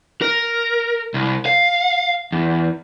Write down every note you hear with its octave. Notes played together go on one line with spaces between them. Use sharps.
A#4
C2
F5
E2